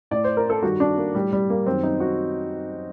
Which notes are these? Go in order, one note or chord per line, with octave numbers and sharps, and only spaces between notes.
A2 D5
C5
A#4
A4
G2 D#3 F#4
D4
A#3
A2 G3
G3
A#3
F#2 D#3 C4
D#4
F#4